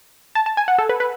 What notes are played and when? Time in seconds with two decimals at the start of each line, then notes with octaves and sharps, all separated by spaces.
0.35 A5
0.46 A5
0.57 G#5
0.68 F#5
0.78 A4
0.89 B4
1.00 B4